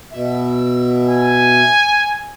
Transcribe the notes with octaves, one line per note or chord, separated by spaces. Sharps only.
B2 E5
G#5